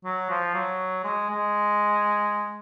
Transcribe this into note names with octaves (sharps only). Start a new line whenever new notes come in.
F#3
F3
F#3
G#3
G#3